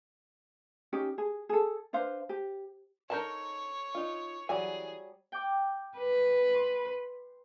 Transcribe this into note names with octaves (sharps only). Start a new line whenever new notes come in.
C#4 D#4 G4
G#4
G#4 A4
D4 B4 C5 F5
G4
D#4 A4 A#4 C#5 G5 A5
D#4 F4
E3 F#3 G3 G#4 D5 G#5
G5 D6
B4
C6